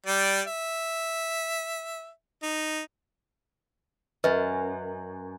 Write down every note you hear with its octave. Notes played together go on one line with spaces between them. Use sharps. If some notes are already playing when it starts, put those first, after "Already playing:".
G3 D5
E5
D#4
F#2 B4 D#5 E5